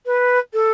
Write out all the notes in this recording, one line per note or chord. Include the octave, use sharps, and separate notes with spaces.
B4
A4